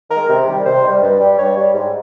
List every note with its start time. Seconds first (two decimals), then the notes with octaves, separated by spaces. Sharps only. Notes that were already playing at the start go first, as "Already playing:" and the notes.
0.11 D#3 G#3 A#4
0.29 C3
0.48 D#3 G3
0.65 C3 C5
0.84 D#3 G3
1.02 G2
1.20 G3
1.38 G2 C#5
1.56 G3
1.74 G#2